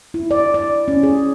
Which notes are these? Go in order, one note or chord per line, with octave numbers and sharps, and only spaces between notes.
E4
D5
D5
C#4
G#4